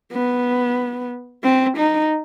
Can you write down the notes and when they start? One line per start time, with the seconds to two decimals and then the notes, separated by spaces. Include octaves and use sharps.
0.12 B3
1.43 C4
1.77 D#4